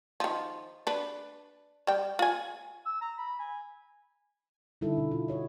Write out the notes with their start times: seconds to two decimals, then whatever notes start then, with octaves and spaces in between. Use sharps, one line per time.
0.20 D#3 F3
0.87 D4 B4
1.87 G3 G5
2.19 F4 G#5
2.85 E6
3.01 A#5
3.18 B5
3.39 G#5
4.81 D3 G3 D#4 E4 A4
4.98 B2
5.11 F4
5.28 F#4 C#5 D#5